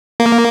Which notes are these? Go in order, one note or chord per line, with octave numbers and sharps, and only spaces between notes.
A#3